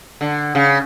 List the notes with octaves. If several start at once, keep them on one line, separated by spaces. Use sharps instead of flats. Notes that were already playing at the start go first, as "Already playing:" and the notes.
D3
C#3